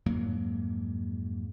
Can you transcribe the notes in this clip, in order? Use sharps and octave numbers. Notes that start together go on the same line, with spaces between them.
F2 G#2 F#3 A#3